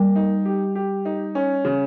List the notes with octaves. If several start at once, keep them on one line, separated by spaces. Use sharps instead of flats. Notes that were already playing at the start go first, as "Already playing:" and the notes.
Already playing: G3 A#3
D#4
G4
G4
D#4
C#4
C#3